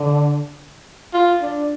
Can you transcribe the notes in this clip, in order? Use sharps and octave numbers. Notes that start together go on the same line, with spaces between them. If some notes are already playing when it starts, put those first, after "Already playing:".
Already playing: D3
F4
D4